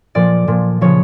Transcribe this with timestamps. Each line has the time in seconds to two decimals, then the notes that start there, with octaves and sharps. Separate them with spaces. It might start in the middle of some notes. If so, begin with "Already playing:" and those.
0.15 A#2 F3 D5
0.47 A#2 F3
0.81 C#3 F3 C#5